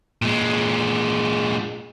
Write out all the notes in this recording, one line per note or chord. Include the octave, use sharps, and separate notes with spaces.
A#2 G#3